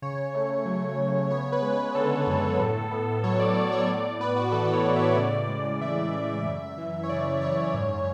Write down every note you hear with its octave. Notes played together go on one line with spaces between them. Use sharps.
C#3 C#5
A3
F#3
C#3
B3 C#5
B4
G#3
B4
D3 A4
F#2
A2
B3
F#3 C#5
D5
A2 D5
C#5
A2 D5
D5
B3 B4
F#4
E3 A4
C#5
A2
E5
D5
C#5
C#3 D5
G#3
E3 E5
C#3
F#2
E3
C#5
C#3 D5
F#2 C#5
G#2